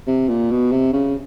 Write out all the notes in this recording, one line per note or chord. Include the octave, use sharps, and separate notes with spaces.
C3
A#2
B2
C3
C#3